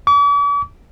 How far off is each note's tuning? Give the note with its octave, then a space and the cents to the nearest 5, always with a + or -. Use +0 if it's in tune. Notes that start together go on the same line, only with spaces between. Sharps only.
D6 -45